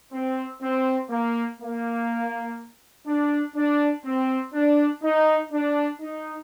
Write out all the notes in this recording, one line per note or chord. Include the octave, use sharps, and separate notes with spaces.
C4
C4
A#3
A#3
D4
D4
C4
D4
D#4
D4
D#4